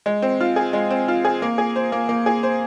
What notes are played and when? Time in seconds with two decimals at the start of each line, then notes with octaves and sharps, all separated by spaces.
0.06 G#3
0.22 C4
0.40 F4
0.56 G#4
0.73 G#3
0.91 C4
1.08 F4
1.25 G#4
1.42 A#3
1.58 G#4
1.76 C5
1.92 A#3
2.09 A#3
2.26 G#4
2.43 C5